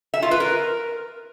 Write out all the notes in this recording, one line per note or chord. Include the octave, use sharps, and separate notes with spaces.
E5
F4
B4
A#4